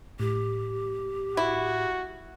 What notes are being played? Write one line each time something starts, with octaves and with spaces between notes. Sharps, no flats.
A2 G4
E4 F#4